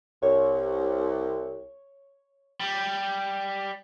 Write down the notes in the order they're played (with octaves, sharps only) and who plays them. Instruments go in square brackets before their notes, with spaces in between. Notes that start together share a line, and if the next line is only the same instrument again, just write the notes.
[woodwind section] C2 [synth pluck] C#5
[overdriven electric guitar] G3